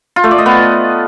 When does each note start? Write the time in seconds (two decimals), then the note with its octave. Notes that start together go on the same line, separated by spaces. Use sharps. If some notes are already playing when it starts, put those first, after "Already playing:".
0.16 F4
0.24 A3
0.31 D5
0.38 D#5
0.46 B3